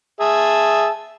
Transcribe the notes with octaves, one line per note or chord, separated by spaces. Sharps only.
G#4 E5 A5